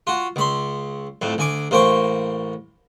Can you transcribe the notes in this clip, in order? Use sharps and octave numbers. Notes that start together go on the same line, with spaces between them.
F4 F#4
C#2 B5 C6
F2 A2
D2 G#5 D6
A1 A#3 C5 G5 C#6